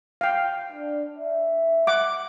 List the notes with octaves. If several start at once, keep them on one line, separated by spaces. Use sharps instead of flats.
F5 G5
D4
E5
F#5 D6